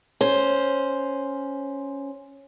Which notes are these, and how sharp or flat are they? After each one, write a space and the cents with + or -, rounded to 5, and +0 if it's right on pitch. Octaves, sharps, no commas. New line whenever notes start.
C#4 +0 C5 +0